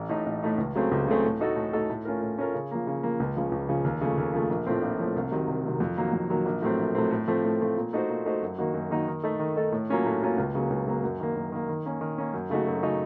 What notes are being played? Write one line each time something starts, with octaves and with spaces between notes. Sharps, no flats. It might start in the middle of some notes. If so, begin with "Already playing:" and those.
Already playing: A1
A2 A3 D#4
A1
A2 A3 D#4
C#2
C#3 F#3 A3 C4
C#2
C#3 F#3 A3 C4
A2
A3 D#4 F#4 A4
A2
A3 D#4 F#4 A4
A2
A3 C#4 F4 A#4
A2
A3 C#4 F4 A#4
C#3
F3 A#3
C#3
F3 A#3
C#2
C#3 F3
C#2
C#3 F3
D#2
C#3 F3 A3
D#2
C#3 F3 A3
A#1
A2 F3 A3 C4
A#1
A2 F3 A3 C4
C2
C3 D#3 F#3
C2
C3 D#3 F#3
F2
D#3 F#3 A#3
F2
D#3 F#3 A#3
A#1
A2 F#3 A3 C4
A#1
A2 F#3 A3 C4
A2
F3 A3 C4
A2
F3 A3 C4
A#2
A3 D#4 F#4 C5
A#2
A3 D#4 F#4 C5
F#2
D#3 A#3 D#4 F#4
F#2
D#3 A#3 D#4 F#4
D#3
A3 D#4 A4
D#3
A3 D#4 A4
A2
F#3 A#3 C#4 F4
A2
F#3 A#3 C#4 F4
C#2
C#3 F#3 A#3
C#2
C#3 F#3 A#3
F#2
D#3 A#3
F#2
D#3 A#3
D#3
A#3 C#4
D#3
A#3 C#4
F#2
C#3 A3 D#4 F#4
F#2
C#3 A3 D#4 F#4